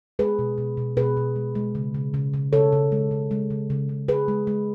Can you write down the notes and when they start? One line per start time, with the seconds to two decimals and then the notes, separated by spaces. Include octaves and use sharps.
0.19 G#3 G#4 B4
0.39 B2
0.58 B2
0.77 B2
0.97 B2 G#4 B4
1.17 B2
1.36 G#3
1.55 G#3
1.75 C#3
1.94 C#3
2.14 C#3
2.34 C#3
2.53 C#3 A4 C#5
2.72 C#3
2.92 G#3
3.11 C#3
3.31 G#3
3.51 C#3
3.70 C#3
3.89 C#3
4.08 G#3 G#4 B4
4.28 G#3
4.47 G#3